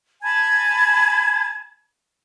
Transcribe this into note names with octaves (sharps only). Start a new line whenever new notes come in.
G#5 A5 B5 G#6